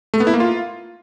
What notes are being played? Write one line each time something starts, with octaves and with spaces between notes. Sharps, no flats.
A3
B3
E4
A#3
F4